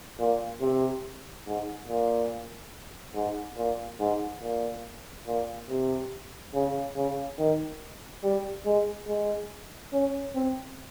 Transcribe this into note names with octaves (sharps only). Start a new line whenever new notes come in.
A#2
C3
G#2
A#2
G#2
A#2
G#2
A#2
A#2
C3
C#3
C#3
D#3
G3
G#3
G#3
C#4
C4